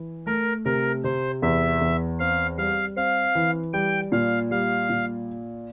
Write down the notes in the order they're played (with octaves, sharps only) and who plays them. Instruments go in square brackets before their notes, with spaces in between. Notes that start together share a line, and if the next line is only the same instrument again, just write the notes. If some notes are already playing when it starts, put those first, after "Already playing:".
Already playing: [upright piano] E3
[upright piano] A3 [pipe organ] A#4
[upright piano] C3 [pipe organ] A#4
[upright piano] C3 [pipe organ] C5
[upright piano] E2 [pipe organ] E5
[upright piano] E2
[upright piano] C4 [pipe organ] F5
[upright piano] G3 [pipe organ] F5
[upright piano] C4 [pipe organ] F5
[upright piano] E3
[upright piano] G3 [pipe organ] G5
[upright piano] A#2 [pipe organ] F5
[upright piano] G3 [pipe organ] F5
[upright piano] A#2